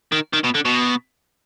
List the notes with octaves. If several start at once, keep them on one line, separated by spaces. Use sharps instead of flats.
D#3
D#3
B2
D3
B2